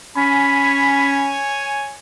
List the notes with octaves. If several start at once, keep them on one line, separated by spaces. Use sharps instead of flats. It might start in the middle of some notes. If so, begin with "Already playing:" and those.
C#4 C#5 G#5 B5